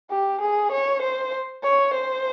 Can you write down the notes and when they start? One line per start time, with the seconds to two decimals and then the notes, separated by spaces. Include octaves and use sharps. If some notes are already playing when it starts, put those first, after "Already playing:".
0.11 G4
0.41 G#4
0.72 C#5
1.02 C5
1.63 C#5
1.94 C5